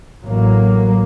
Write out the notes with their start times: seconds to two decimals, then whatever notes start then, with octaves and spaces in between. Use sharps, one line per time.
0.23 A1 F#3 A#3